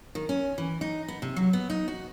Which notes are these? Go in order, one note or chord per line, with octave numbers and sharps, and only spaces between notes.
D#3
C#4
E3
D#4
B3
C3
F#3
B3
D#4
F#4